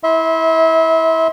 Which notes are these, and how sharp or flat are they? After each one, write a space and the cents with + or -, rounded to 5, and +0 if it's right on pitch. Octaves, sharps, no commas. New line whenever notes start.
E4 -15 E5 -30 C6 +0